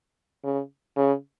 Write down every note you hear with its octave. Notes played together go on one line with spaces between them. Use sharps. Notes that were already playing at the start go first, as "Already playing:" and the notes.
C#3
C#3